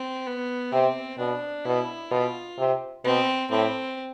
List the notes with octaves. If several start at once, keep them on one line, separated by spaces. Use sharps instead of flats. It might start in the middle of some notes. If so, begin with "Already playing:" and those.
Already playing: C4
B3
C3 C4
B2 D4
B2 E4
B2 F4
C3
B2 C4
A2 C4